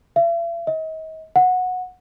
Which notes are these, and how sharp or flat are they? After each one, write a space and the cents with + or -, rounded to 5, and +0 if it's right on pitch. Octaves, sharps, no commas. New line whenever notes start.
E5 +45
D#5 +40
F#5 -15